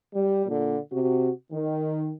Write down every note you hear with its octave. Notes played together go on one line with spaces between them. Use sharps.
G3
A#2 D3
C3 F#4
D#3